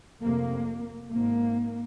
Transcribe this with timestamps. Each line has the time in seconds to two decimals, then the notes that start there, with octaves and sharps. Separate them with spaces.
0.22 F1 F2 C3 A#3
1.12 G#1 G#2 A#3